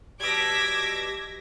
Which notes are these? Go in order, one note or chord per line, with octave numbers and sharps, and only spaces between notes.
B2 G3 D6 E6 G#6 A#6 B6